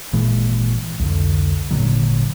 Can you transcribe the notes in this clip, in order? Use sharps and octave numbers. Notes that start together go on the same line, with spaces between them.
G#1 A#2 E3 G#3
C2 F2 D3
G#1 A#2 D3 F#3